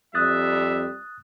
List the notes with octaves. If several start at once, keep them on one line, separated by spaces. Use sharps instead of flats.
F2 G3 E5 D#6 F#6 A6